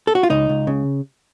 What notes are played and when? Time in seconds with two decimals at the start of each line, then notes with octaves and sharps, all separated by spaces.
0.07 A4
0.15 F#4
0.23 F4
0.30 C#2 D#4
0.49 C#2
0.67 C#3